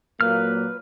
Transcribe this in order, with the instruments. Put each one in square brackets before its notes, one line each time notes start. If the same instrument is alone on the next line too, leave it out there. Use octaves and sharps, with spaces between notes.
[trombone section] A#2 F#3 A#3 [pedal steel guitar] B4 F6